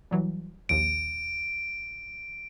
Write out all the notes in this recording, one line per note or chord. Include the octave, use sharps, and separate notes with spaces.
E3 F#3 G3
A#1 D#2 D7